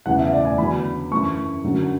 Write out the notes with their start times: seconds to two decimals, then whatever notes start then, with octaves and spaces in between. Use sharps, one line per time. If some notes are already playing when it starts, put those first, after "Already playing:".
0.06 E2 C#3 E3 F#5
0.19 E5
0.33 D5
0.45 G#5
0.58 E2 D3 F#3 B5
1.11 F#2 E3 C#6
1.64 F#2 D3 F#3